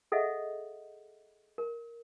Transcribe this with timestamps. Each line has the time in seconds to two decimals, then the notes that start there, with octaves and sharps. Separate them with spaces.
0.12 G#4 A4 D#5 E5 F#5
1.58 A#4